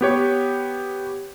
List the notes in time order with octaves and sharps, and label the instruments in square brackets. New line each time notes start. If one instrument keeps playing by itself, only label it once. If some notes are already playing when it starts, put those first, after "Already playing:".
[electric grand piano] B3 G4 C#5